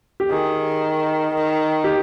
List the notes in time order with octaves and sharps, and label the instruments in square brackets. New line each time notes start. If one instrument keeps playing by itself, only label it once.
[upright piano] G4
[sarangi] D#3 [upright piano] G#4
[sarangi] D#3
[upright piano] G4